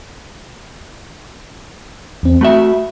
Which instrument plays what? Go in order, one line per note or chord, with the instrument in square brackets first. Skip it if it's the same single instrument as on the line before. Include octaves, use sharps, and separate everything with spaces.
[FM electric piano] E2 C4
[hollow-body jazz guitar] A3 F#4 E5 [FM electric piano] B5